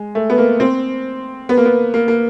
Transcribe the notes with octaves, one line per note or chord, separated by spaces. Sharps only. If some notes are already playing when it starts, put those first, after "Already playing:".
Already playing: G#3
A3
B3
A#3
C4
B3
A#3
B3
A#3
A#3